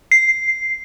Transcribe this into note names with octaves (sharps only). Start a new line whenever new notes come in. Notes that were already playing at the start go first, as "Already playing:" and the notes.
C7